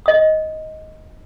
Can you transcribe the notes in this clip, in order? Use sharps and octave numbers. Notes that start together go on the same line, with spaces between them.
D#5 D#6